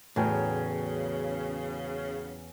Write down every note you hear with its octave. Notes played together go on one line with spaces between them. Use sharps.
E2 A2 C#3 F#3 C#4 G5